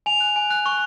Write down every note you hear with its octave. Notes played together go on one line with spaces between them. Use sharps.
G#5 F7
F#6
G#5
F#6
C#6